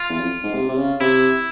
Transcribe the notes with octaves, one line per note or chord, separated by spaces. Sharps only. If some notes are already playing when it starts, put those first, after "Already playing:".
Already playing: F4
E2
F2
G#2
C3
C3
C#3
C3 E4